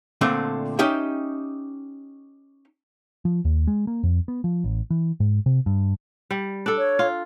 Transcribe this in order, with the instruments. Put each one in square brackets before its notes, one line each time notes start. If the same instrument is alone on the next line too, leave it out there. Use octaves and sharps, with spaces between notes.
[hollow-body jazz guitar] A#2 D3 A3 C4
C#4 D#4 G4 E5 G5
[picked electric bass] F3
D#2
G#3
A#3
F2
B3
F3
A1
E3
G#2
C3
G2
[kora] G3
D4 A4
[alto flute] C#5
[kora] F4